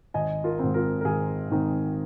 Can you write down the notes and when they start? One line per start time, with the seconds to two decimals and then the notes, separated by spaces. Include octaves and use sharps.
0.14 G#1 D#5 G#5
0.44 F4 A#4
0.59 G#2 D#3 C4
0.74 F4 A#4
1.01 A#4
1.04 G#1 G#4
1.50 G#2 D#3 C4